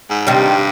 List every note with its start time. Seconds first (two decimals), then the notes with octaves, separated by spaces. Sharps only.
0.10 G#2
0.27 G2 C3 D#3 G3